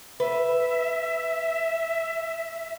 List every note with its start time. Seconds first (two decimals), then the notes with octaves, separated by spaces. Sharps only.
0.20 B4 E5